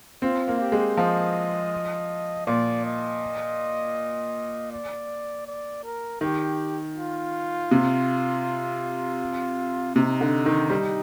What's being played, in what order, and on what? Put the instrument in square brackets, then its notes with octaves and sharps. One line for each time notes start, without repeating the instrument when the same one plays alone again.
[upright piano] C4 [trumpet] F4
[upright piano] A#3
[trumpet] G4
[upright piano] G#3
[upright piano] F3 [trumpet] D#5
[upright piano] A#2 [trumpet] D5
[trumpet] D#5
D5
D5
A#4
[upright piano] D#3 [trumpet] G4
[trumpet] F4
[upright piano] C3
[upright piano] C3 [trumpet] D#4
[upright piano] D3
D#3
G3